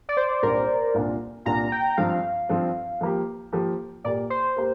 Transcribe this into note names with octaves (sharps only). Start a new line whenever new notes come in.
D5
C5
C2 A#2 G3 D4 G4 A#4
C2 A#2 A#3 D4 F4
C2 A#2 A#3 D4 F4 A#5
G5
G2 F3 C4 F5
G2 F3 C4
F3 A#3 G4
F3 A#3 G4
A#2 A#3 G4 A#4 D5
C5
A#3 G4 A#4